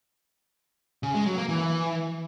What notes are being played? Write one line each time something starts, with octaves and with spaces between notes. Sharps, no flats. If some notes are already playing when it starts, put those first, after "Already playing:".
C#3
G#3
F#3
A#3
E3